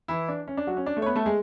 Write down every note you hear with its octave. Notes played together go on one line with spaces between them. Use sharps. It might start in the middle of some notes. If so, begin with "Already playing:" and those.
E3 E4
D4
C#4
D4
F#3 F#4
C#4
D4
A3 A4
C#5
B3 B4
A3 A4
G#3 G#4